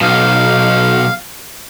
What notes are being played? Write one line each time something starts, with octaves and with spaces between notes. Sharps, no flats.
B1 B2 F5